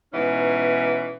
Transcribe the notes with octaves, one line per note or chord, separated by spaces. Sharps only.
G#2 B2 E3 C#4 D#4